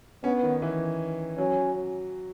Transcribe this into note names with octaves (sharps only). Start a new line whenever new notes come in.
B3 C#4
D#3
E3
F#3 C#4